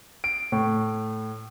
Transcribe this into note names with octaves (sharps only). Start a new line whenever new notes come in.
D7
A2